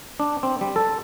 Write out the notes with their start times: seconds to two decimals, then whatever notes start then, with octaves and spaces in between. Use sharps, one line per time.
0.20 D4
0.43 C4
0.61 G3
0.76 A4